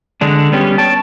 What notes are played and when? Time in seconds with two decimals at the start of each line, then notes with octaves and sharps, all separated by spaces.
0.21 D3 G#3 D4
0.52 G3 B3 C#4 G4
0.78 C#5 G5 A5